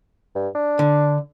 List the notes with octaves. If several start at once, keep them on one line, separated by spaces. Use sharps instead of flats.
G2
D4
D3